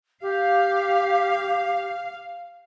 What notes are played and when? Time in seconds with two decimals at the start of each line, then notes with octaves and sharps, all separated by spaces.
0.22 G4 F5